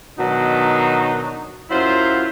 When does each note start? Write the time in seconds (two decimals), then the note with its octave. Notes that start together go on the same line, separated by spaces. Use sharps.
0.18 B2 D#3 F#3 D4 D#4
1.70 F#2 F#3 E4 F4 C5